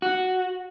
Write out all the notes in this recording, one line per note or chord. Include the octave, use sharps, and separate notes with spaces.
F#4